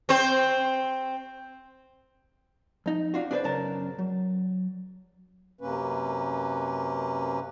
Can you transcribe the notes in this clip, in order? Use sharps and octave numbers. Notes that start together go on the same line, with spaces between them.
C4 C5
F2 D#4
D4 F4 F#4
D4 F#4 G#4 B4 C5 D5
B1 F#2 C#3 A#4 A5
F#3
F#2 C3 A#3 C#4 B4